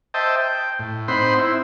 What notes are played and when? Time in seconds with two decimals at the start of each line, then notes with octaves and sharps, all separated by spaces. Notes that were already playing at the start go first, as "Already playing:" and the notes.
0.14 C5 D#5 E5 G5 A5
0.41 G5
0.79 A2
1.08 C4 D#4 C5 F#5 B5 C6
1.39 C4 E4